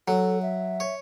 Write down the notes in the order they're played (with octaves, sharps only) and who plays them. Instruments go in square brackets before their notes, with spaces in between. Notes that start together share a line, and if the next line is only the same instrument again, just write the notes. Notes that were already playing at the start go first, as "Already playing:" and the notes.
[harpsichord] F#3 [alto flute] A4
[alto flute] E5
[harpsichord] C#5